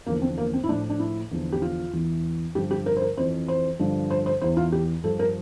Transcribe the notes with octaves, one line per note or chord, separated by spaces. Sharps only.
E2 D3 F3 A#3
C4
A#3
C4
E4
A2 F3 D4
D4
E4
E2 D3 F3
G4
F4
E2 E3
G2 D3 F3 G4
G4
A#4
C5
A#4
F2 E3 C5
C5
G2 D3 F3
C5
C5
E2 E3 C5
F4
G4
G2 F3 A4
A#4